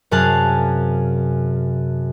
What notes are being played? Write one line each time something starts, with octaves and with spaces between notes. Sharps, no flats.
F#2 C3 G#4 F5 A5 F#6